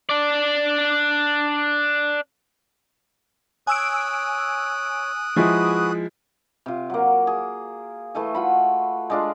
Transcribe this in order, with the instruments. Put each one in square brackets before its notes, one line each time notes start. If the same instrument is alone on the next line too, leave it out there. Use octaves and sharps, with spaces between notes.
[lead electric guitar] D4 D5
[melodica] C#5 [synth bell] G#5 E6 D7 [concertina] D#6 F#6
[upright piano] F3 G#3 E4 [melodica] F#4 G#4 B4
[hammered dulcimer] C3 F4
F#3 A#3
G#4
E3 A3 A4 G#5
F4 F#4 B5
G#3 D4 F4